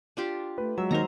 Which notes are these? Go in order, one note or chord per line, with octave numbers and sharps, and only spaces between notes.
D4 F4 G4
A3 B4
F#3 G#3 E5
D#2 D#4 A#4 C5 A#5